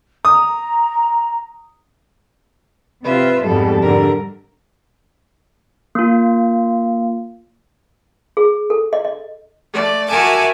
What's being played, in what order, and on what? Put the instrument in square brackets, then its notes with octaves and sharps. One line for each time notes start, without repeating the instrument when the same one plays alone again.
[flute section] A#5 [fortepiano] D#6
[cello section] C3 F4 [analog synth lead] B4 [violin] E5
[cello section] F2 G#2 B2 [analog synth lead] G3 [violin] A4
[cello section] G#2 D3 [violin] A#4
[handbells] A#3 F4
[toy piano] G#4
A4
D#5
D#5
[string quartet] A3 D5
F#4 A#4 E5 G#5 A5 D6